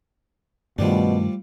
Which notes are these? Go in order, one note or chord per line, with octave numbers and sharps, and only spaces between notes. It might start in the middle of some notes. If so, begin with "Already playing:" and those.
G2 B2 D#3 F3 G3 A3 D4